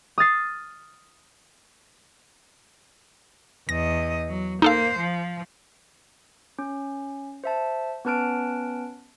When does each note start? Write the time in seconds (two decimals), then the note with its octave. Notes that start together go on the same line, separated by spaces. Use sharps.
0.18 D#6 F6 A6 C7
3.69 E2 D#5 A#6
4.29 F#3
4.62 A#3 D#4 A4 C5 F5
4.99 F3
6.59 C#4
7.44 C5 E5 A5
8.05 B3 C#4 B4 A5 F6 D7